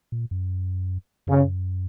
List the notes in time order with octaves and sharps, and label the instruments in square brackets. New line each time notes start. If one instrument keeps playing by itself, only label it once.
[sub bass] A#2
F#2
[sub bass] F#2 [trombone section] C#3